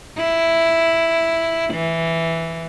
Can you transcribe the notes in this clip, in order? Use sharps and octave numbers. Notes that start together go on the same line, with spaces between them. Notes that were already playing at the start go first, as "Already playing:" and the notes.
E4
E3